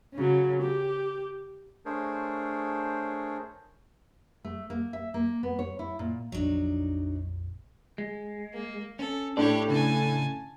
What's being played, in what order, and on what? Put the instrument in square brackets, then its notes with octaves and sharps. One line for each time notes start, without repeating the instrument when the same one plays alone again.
[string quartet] C#3 F#3
G4
[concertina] A3 D4 G#4 A#4 C5 C#5
[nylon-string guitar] A3
A#3
E5
A#3
B3
C#5
E4
A#2
[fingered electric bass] A#1 F2 F3 [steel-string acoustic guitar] F#3 D4 D#4
[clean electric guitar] G#3
[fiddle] A#3
[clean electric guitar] C#4 [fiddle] A4
[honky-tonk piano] A2 D4 [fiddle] G4 C#5 [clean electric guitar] D5
[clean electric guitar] C#3 [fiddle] G#5 A5